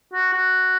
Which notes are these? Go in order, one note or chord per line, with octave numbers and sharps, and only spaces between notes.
F#4
F#4